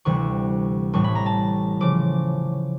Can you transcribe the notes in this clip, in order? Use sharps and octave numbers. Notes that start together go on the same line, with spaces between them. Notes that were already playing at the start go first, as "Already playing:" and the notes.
D2 C3 E3 G3 C#6
A1 A2 E3 G3 C#6
B5
A#5
A5
C#3 F3 D6